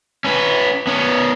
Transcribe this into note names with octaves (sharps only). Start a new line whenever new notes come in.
C#4 B4
B3 C#4